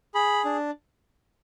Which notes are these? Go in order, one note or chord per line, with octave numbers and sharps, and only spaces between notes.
G#4 B5
D4